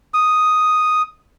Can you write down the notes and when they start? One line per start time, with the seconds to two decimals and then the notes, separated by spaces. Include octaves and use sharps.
0.14 D#6